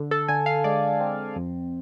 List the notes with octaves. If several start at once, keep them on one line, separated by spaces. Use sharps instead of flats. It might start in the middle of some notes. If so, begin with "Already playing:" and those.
Already playing: D3
A4
D3 G#5
F5
G#3 D5
C4
F2